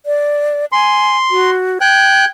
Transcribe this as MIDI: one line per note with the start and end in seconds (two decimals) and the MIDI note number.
0.06 0.65 74
0.72 1.17 80
0.72 1.50 84
1.31 1.79 66
1.81 2.25 79
1.81 2.25 90
1.81 2.27 92